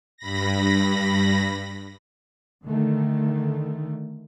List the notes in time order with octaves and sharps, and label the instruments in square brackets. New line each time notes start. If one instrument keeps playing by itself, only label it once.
[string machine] G2 B5 A#6
[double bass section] D3 D#3 A3